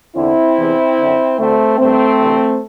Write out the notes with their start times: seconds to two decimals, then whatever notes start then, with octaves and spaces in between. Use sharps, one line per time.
0.16 E2 D3 C4 E4
0.57 E2 C3 E3
0.98 F#2 D3
1.39 D2 D3 A3 C4
1.79 G2 D3 A3 C4
2.21 D2 C3 E3